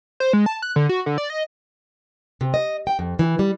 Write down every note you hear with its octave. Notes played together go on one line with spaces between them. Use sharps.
C5
G#3
A5
F#6
D3
F#4
D3
D5
D#5
C3
D#5
G5
F2
E3
G3